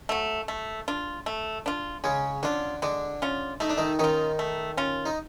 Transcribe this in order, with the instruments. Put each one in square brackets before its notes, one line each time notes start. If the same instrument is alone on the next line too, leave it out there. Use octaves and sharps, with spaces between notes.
[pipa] F#3 A3
A3
D4 F4
A3
D4 F4
[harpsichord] C#3 C#4 [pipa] G#3
[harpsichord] D3 D4 [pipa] C#4 F4
[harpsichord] D3 D4 [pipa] G#3
[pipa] C#4 F4
[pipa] A3 [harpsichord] D#4
[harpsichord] D4
D#3 D#4
[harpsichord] D#3 D#4 [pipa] C#4 F4
[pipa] A3
C#4 F4
[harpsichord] D#4